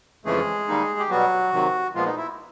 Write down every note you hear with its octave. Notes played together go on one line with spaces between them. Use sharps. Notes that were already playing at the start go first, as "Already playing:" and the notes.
F2 C#3 E3 G#3 A3 C#4 G#4
D#3 G3 A#3 D#4
G4
B2 F#3 G3 B3 F#4
C3 D#3 F#3
A#2 F3 G#3 B3 F4
D#4
E4